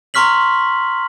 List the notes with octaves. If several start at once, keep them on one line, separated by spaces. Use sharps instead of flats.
A#5 C6 C#6 F6 B6 F#7